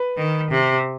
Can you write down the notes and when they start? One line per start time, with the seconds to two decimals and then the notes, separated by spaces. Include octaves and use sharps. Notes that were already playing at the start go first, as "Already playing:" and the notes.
Already playing: B4
0.17 D#3
0.51 C3